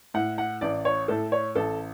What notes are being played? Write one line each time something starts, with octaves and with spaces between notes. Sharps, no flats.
A2 F#5
F#5
A1 D5
C#5
A2 A4
C#5
A1 A4